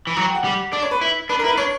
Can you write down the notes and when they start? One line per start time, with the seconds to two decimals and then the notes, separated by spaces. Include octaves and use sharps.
0.07 E3
0.16 F#3 A#5
0.25 G5
0.35 F#5
0.44 G3
0.72 D4 D5
0.82 C#5
0.91 B4
1.01 E4
1.29 D4 B4
1.39 A#4
1.44 E4
1.48 B4
1.57 D4 C#5